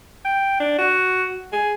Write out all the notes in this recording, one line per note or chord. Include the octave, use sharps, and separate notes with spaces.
G5
D4
F#4
G#4